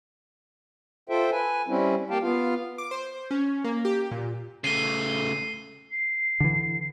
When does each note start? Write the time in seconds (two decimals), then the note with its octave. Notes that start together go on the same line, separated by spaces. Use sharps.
1.09 F4 A4 C5 E5 G5
1.32 B4 G#5
1.68 G3 C4 C#4 E4
2.10 A#3 G4 F5 G5 A5
2.22 B3 F4 F5
2.78 D6
2.91 C5
3.31 C#4
3.64 A#3
3.85 G4
4.11 A#2
4.64 C#3 A3 C7 D#7 G7
5.91 C7
6.40 D3 E3